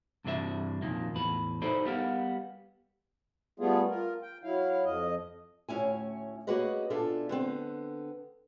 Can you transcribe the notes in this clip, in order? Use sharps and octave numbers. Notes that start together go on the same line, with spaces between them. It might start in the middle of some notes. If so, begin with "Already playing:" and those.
G2 C3 E3 D4 B4 E5
F2 A#2 D#3 A#3
E2 A2 B4
D#4 E4 A4 B4 C5 D5
G3 B3 A#4 F5
G3 A3 B3 F4 G#4
F4 A#4
G5
F#3 E4 F5
F2 D#5
D2 A2 C#4 E4 G#5
A#3 C#4 F#4 G#4 B4 D#5
B2 D4 F4 A4 E5 G#5
D3 B3 C4